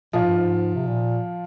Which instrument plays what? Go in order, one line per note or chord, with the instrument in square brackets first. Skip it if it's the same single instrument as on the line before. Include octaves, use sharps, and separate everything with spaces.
[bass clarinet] A#2 [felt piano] F3 F4
[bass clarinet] G#2
G2
G#2
C3
A#2